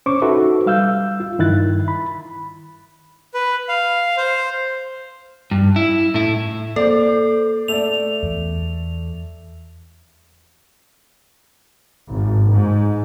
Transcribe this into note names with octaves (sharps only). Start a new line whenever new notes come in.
C#4 C5 C#6 D6
D#4 F#4 A4 B4 E5
G3 F5 E6 G6
F4
G2 D#3 E4 F#6 A6
B5
B4
F5
C5
G2
E4
A2 E4
A#3 A4 C5 D5
A3 D5 F7
E2
G#1
G#2